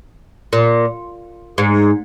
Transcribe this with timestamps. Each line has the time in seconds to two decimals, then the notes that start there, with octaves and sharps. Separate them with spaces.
0.53 A#2
1.58 G#2